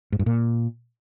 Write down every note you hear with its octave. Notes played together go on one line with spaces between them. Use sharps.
G#2
G2
A#2